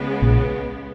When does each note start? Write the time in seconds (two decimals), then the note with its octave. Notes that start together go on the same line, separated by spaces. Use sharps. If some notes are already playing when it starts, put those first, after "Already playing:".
Already playing: C#2 C#3 G#3 B3
0.22 A#1 A#2